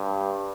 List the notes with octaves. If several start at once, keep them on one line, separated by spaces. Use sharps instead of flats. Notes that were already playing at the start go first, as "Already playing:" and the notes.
Already playing: G2